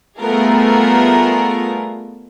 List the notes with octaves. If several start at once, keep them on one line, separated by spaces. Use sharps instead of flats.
G3 A3 B3 F4 G#4 A#4